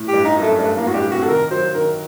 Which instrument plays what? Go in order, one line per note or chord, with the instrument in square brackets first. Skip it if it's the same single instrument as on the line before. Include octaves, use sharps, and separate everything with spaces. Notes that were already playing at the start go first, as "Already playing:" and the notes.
Already playing: [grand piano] A2
[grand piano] G2 [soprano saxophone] G4
[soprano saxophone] D#4
[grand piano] F#2
[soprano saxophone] A3
[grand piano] F#2
[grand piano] G2 [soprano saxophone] A3
[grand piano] A2 [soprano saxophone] A#3
[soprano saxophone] F#4
[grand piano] G2 [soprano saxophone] G4
[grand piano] C3 [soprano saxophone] F#4
[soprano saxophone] A4
[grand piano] D#3 [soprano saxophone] A#4
[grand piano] F#3 [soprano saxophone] C5
[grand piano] D#3 [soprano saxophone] A#4